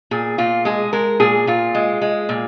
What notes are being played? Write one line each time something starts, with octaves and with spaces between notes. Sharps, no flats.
A#2 G#4
A#2 F4
G#3 G#4
G#3 A#4
A#2 G#4
A#2 F4
G#3
G#3
A#2